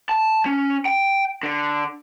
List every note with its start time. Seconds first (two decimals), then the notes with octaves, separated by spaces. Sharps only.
0.09 A5
0.46 C#4
0.86 G5
1.43 D3